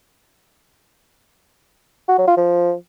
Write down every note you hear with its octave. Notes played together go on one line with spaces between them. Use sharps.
F#4
F#3
F4
F3